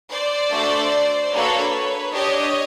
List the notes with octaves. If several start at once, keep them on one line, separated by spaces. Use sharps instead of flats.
C5 D5
A3 D4 F#4 A4
A#3 D4 F#4 A4 B4 C#5
D4 G4 C#5 D#5